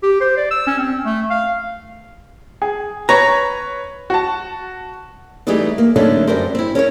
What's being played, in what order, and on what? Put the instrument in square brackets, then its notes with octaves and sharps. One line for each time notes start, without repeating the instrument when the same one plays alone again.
[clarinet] G4
C5
D5
E6
C#4
C4
A3
F5
[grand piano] G#4
[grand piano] B4 C#5 [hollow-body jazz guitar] A#5
[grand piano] F#4 A5
[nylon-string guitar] E3 G3 A3 D#4 G4 G#4
A#3
D3 F#3 A3 A#3 C#4 D#4
F#2 G3 A#4 C5
C4 E4
C#4 A#4 C5 C#5